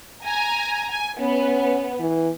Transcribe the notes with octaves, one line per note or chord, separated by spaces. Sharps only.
G#5 A#5
G#5
B3 C#4
E3